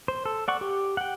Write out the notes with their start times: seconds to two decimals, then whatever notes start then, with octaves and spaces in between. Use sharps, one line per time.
0.08 C5
0.26 A4
0.48 D5 F#5 C#6
0.61 G4
0.97 F#5 G5